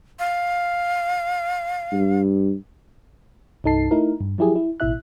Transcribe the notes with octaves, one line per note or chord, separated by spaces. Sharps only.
F5
G2
C2 G2 D#4 A4 A5 C7
A3 D#4 E4 A#4
G2
F3 F#3 E4 G4 G#4
E4
A1 B2 E4 E5 F#6